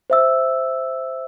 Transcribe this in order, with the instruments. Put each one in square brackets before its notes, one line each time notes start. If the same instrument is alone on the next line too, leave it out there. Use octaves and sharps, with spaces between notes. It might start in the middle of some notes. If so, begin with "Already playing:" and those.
[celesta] C5 E5 E6